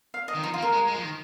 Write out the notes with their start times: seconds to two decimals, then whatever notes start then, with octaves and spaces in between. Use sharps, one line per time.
0.14 F5
0.28 D#5
0.35 D#3
0.43 F3 D#4
0.54 F4
0.58 A#3
0.62 A#4
0.72 G#3
0.87 G#3
0.95 F3
1.02 D#3